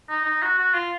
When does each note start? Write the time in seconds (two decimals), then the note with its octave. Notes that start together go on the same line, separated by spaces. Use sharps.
0.09 D#4
0.25 D#4
0.42 F#4
0.58 F#4
0.74 F4